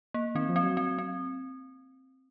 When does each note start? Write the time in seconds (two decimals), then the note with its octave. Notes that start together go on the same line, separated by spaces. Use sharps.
0.14 A#3
0.35 D#3 C4
0.49 F3
0.56 C4
0.63 F#3
0.77 C4
0.98 C4